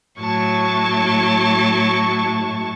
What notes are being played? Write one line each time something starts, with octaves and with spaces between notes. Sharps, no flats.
A2 F#3 A5 C#6